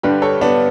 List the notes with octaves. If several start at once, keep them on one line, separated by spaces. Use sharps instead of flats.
G2 D3 G3 G4 B4
A4 C#5
B3 D4